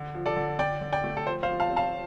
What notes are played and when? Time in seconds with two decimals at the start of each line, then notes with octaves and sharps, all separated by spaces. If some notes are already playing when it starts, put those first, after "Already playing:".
Already playing: D3
0.15 F3
0.26 A4 D5
0.36 D3
0.59 D3 D5 G5
0.81 D3
0.92 D5 G5
1.04 A3
1.17 A4
1.26 F3 C5
1.43 C5 F5
1.49 F3
1.60 F5 A5
1.70 C4
1.76 F5 A5